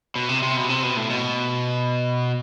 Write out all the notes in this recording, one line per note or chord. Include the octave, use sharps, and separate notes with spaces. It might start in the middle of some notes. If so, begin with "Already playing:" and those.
B2
C3
C3
B2
C3
B2
A2
B2